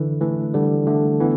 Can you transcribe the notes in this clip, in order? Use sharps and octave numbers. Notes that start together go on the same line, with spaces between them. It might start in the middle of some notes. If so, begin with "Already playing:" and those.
Already playing: D3 E3
E3 A3
D3 G3
D3 A3
E3 B3